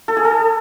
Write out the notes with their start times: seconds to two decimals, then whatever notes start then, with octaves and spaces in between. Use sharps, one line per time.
0.08 A4
0.17 G#4
0.25 A4